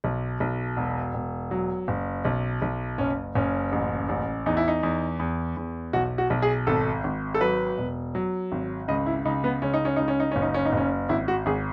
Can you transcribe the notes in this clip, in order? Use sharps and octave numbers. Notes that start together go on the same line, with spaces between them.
B1
B1
E1
E1
F#3
F#1
B1
B1
F#1 C#4
F#1 C#4
A1
A1
E2 D#4
E4
D#4
E2
E2
E2
B1 F#4
F#4
B1
G#4
G#1 A4
G#1
A4
F#3 B4
E1
F#3
G#1
C#2 D#5
E4
C#2 D#4
B3
C#2 C#4
D#4
C#4
C#2 D#4
C#4
D#4
F#1 C#4
D#4
C#4
D#4
F#1 C#4
G#1 E4
F#4
G#1 G#4